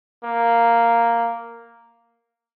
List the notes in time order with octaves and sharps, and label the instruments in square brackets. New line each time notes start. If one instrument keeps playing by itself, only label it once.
[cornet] A#3